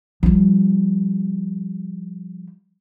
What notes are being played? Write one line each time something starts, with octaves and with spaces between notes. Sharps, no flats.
F3 G3